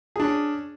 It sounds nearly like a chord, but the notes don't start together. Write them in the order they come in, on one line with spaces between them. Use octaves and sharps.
G#4 D4 C#4